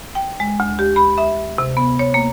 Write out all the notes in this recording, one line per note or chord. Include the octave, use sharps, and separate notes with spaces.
G5
G#3
D2
G4
B5
E5
C3
B3
C#5
A#3